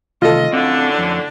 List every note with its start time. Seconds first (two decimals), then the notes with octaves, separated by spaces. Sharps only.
0.22 C3 D#3 A3 F4 A4 D#5
0.53 F#2 A2 D3 C4 D4 F5
0.98 F2